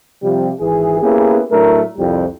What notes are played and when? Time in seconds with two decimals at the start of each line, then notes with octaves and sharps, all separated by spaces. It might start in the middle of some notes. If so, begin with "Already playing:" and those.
0.23 C3 F3 G3
0.60 G#1 E3 G#4
1.01 A#3 B3 C#4 E4 G4 G#4
1.51 A2 F#3 A3 D4 A#4
1.98 C2 F2 G3